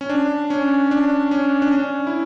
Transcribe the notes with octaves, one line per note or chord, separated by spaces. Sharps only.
C#4
D4
C#4
D4
C#4
D4
C#4
E4